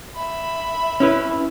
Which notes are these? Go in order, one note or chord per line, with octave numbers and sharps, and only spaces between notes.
E5 B5
C#4 E4 B4